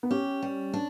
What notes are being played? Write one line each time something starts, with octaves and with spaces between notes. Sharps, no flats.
B3
C#4 G4
G3
D4